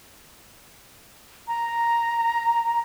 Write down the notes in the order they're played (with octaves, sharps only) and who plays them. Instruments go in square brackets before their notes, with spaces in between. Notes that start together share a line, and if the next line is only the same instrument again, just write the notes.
[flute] A#5